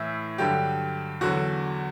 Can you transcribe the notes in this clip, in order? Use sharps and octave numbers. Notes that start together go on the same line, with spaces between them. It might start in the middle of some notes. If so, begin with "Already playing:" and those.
Already playing: A2 E3 E5
G2 D3 F#3 G4
E2 D3 F#3 F#4